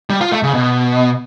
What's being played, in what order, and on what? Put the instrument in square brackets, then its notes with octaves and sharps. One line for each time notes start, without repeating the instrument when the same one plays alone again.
[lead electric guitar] G3
F4
A3
C#3
B2